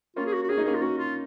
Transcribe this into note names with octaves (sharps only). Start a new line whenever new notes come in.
A#3 C#4 F4
G#4
F#4
F#4
C#4 G#4
D#4
A#3 C#4 G#4
F4
A#3 C#4 F#4
F4